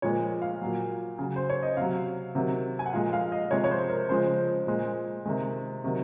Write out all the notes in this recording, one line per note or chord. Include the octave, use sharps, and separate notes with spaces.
A#2 F3 G#3 C#5
F5
A#2 F#3
C#3 F#3
C5
C#5
D#5
C3 F#3 F5
C3 D#3 F#3
G#5
F#5
A#2 F3 G#3 F5
F5
D#5
C3 F3 G#3 C#5
C#5
C5
A#4
C#3 F3 G#3 C5
A#2 G#3
C3 D#3 G#3
C3 D#3 F#3